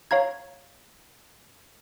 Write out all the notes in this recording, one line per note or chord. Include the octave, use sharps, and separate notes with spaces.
C#5 F5 A#5 G#6